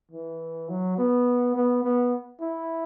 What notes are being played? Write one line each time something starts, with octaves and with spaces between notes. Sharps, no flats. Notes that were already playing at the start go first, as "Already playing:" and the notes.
E3
F#3
B3
B3
B3
E4